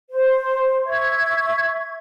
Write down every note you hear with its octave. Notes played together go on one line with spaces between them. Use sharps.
C5
E5 C#6 G#6